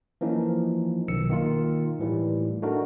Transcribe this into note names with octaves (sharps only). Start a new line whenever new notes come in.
E3 F3 A#3 C#4 D#4
B1 D#3 E6 C#7
D#3 A#3 D#4 F4 A#4
A2 E3 G3
A3 D4 D#4 F#4 A#4